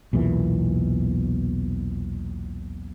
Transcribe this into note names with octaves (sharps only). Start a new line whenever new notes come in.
B1 E2 A#2 E3